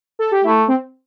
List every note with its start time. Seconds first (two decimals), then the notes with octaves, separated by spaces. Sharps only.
0.19 A4
0.32 G4
0.44 A3 E4
0.68 C4